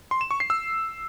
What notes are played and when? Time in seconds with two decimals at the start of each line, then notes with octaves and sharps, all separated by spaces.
0.11 C6
0.21 E7
0.31 C#6
0.40 C7
0.50 E6